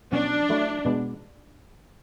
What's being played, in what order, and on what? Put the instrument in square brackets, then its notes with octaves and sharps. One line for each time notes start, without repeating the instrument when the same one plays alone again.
[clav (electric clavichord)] B2 F#3 C#4 [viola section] D4
[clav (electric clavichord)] F#3 A3 E4
B2 G#3 B3 D4